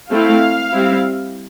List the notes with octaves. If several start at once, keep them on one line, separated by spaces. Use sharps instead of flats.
A3 C4 E4 F5
G3 C4 E4